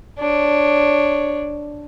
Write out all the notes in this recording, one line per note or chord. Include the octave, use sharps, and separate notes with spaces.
D4 C#5